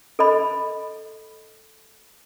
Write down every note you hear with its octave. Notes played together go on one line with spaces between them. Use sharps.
A4 D#5 B5